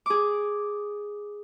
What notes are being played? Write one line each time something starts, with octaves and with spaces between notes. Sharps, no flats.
G#4 D6